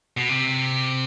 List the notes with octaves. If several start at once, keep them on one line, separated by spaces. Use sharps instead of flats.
B2
C3